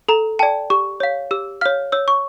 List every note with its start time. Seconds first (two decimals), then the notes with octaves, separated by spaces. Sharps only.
0.09 A4 A#5
0.39 D5 G5 A5
0.70 G4 C#6
1.00 C#5 F5
1.31 G4 E6
1.61 C#5 F5 F6
1.92 C#5 E6
2.08 C#6